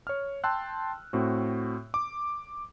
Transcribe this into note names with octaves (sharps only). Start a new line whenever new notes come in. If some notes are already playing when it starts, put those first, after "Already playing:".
C#5 F6
G5 A5 C6 E6 F#6
A2 C4 F#4
D6